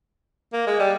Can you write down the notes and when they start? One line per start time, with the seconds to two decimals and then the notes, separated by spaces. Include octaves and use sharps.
0.53 A#3
0.67 G#3
0.79 G3